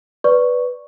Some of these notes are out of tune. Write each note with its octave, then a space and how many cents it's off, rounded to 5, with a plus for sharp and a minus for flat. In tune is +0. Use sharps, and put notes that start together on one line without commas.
B4 +0 D5 -10 C#6 +0